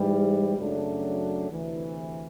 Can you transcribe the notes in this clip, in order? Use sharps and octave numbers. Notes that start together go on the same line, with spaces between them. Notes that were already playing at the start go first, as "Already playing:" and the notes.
Already playing: G#2 E3 G3
F#2 C#3 F#3 A3 D4
D2 C3 E3